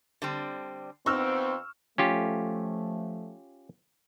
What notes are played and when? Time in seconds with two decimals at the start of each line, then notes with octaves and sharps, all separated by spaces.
0.22 D3 G3 C4
1.06 F2 B3 C4 D#4 C#6 E6 F6
1.98 F3 A3 C#4 F4 G4